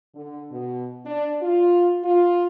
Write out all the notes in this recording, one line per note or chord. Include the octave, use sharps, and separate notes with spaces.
D3
B2
D4
F4
F4